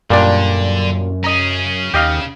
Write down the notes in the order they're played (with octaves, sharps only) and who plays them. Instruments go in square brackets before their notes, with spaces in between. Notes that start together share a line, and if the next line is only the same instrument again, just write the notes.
[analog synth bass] F#2 [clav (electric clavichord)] A#2 G3 D4 [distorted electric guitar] D3
[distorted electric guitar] C#4 G#4 [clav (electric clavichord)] D#5 A#5
[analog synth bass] D#2 [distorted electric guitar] C#3 [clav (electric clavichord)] G4 D#5 F5